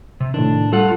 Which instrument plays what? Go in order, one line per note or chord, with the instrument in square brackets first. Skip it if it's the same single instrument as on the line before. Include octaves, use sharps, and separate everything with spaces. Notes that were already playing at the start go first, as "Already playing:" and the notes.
[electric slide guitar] C3
[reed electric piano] A2 D#3 [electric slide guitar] D4
[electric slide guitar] G3 F4 F#5 [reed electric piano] A4